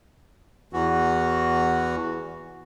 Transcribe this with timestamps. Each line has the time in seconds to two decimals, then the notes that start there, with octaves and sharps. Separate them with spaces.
0.73 E2 E3 F#4